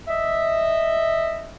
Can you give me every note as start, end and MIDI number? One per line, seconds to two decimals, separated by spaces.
0.08 1.54 75
0.08 1.54 76